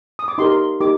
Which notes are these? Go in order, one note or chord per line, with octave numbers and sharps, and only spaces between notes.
D#6
D6
D#4 G4 A#4 C6
C6
D#4 G4 A#4 D6